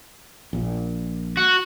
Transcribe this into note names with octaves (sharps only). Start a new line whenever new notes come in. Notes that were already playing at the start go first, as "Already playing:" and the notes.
A#1 A#2
F#4